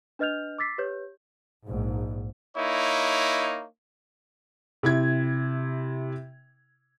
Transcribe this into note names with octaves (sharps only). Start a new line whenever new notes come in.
D4 B4 D#5 F6 G6 F7
D6 E6 A6 B6 C7
G4 B4 C#5 G6
A#1 G#2
A#3 D#4 E4 C#5
C3 E4 G#6